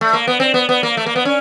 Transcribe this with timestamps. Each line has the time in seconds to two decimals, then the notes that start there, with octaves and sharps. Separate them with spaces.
0.01 A3
0.13 A#3
0.27 B3
0.40 C4
0.54 B3
0.69 B3
0.83 A#3
0.97 A3
1.06 A#3
1.16 B3
1.25 C#4